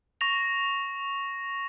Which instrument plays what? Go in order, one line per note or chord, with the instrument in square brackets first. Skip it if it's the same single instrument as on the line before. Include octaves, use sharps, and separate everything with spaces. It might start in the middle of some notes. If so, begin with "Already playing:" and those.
[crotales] C#6 A#6 F7